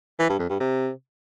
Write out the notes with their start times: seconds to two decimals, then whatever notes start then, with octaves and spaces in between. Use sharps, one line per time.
0.19 E3
0.29 G2
0.39 F2
0.49 G2
0.60 C3